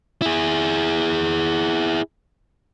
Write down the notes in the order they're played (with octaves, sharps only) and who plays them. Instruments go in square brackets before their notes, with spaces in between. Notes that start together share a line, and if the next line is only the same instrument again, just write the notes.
[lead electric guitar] E4 G#4